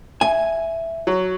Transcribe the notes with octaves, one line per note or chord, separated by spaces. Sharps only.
E5 G#5
F#3